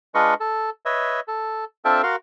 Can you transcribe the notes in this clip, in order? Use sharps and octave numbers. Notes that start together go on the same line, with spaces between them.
G#3 D4 F4 B4 D#5 C#6
A4
B4 C#5 D#5 E5
A4
C4 D4 F4 A4 E5 G5
F#4 A#4 F5 C6